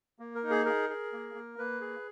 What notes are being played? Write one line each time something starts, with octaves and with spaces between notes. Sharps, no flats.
A#3
A#4
D#4
G#4
G#4 A#4
G#4
A#3
A#3
A#3 B4
G#4